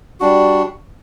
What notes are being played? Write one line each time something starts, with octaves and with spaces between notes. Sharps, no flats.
G3 D4 F#4